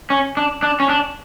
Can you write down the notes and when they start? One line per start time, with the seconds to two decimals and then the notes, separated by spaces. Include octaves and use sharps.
0.10 C#4
0.37 D4
0.63 D4
0.80 C#4
0.89 D4